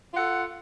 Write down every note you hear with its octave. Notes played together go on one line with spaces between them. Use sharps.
F4 A4 F#5